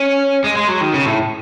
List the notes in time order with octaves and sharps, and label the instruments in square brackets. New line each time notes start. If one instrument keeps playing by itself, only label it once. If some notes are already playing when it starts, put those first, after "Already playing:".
Already playing: [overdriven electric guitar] C#4
G#3
G#3
F#3
D#3
C#3
A2